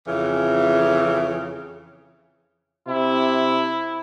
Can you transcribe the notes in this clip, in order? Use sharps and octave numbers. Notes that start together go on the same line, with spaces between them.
F2 C#3 E3
C3 E4